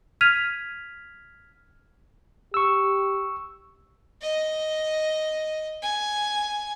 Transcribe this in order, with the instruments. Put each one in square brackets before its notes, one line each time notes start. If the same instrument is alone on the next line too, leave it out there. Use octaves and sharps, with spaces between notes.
[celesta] F6 G#6 B6 D#7 F7
[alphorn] G4 [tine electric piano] C#6 E6
[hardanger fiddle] D#5
G#5